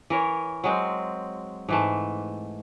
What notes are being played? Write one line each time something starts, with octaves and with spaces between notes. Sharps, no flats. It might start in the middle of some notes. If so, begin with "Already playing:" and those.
E3 A#4 C#5
F#3 G#3 C4
G#2 E3 A3